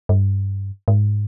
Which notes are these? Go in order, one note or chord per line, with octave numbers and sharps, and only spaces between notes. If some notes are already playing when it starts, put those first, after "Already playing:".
G2
G#2